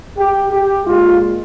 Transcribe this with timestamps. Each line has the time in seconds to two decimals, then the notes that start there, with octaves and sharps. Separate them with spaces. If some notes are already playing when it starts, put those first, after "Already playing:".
0.18 G4
0.52 G4
0.85 A#2 G#3 F4